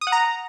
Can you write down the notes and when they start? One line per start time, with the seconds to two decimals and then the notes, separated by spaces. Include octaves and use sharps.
0.01 D#6
0.07 F#5
0.12 A#5